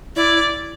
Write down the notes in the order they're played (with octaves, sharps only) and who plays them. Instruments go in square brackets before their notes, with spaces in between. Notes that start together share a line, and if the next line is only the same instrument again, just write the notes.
[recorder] E4 [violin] D5